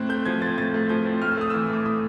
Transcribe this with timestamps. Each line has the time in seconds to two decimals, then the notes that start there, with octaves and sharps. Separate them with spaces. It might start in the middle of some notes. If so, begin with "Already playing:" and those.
Already playing: A2 C4 F#6
0.09 A3 G6
0.25 F3 G#6
0.42 C4 A6
0.57 A2 A6
0.74 A3
0.89 F3 G6
1.05 C4
1.22 A2 F6
1.31 E6
1.37 A3 D#6
1.50 E3 E6
1.70 A2 D6
1.85 A2 D#6